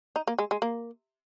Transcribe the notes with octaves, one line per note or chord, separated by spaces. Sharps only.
D#4
A#3
G#3
G#3
A#3